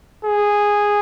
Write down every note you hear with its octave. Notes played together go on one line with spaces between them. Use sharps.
G#4